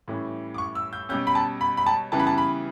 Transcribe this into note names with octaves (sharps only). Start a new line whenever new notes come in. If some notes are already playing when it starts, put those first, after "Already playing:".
A2 E3 G3 C#4
D6
C#6
E6
G6
B2 G3 C#4 G6
B5
A5
B5
B5
A5
C#3 E3 G3 B3 A5
B5
A5
B5